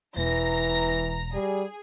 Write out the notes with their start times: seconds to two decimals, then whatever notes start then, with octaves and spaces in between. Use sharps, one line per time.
0.17 E1 E3 A#5 A#6
1.34 G3 G#4